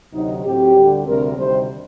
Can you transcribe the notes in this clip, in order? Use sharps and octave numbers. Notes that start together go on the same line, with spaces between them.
D2 C3 F#3 D#4
A2 F#3 C4 G4
D2 D3 G3
D2 C3 G3 C4 A#4
D2 C3 D#3 G3 C5